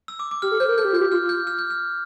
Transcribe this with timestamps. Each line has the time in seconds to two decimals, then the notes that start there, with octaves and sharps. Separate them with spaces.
0.08 E6
0.19 D6
0.31 D6
0.42 G4 F6
0.51 A4
0.60 C5 G6
0.68 A#4
0.77 A4 G6
0.85 G4
0.93 F4 G6
1.01 G4
1.12 F4 F6
1.29 G6
1.47 F6
1.59 G6
1.70 F6